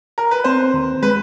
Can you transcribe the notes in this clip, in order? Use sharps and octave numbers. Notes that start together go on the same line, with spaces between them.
A#4
B4
C4 C5
D#2
G#3 B4